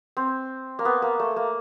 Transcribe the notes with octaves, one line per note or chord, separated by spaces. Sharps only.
C4
A#3
B3
A#3
A3
A#3